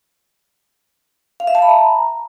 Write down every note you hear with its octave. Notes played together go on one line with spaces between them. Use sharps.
F5
E5
A5
B5
A#5